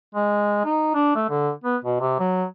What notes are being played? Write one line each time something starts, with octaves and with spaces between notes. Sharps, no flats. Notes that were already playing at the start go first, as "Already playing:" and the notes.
G#3
D#4
D4
A3
D3
B3
B2
C3
F#3